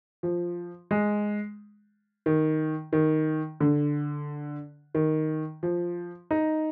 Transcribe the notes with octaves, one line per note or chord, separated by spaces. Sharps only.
F3
G#3
D#3
D#3
D3
D#3
F3
D#4